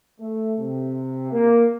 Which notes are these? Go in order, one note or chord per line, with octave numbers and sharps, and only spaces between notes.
A3
C3
A#3